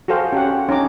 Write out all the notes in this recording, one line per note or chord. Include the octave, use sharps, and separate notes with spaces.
F#4 G#4 A4 C5 F5 G5
C#4 G4 F#5
C#4 D#4 A#5 D6